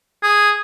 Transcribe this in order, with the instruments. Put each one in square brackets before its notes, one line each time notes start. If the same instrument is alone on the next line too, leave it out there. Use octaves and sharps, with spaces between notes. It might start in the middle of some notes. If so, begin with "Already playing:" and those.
[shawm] G#4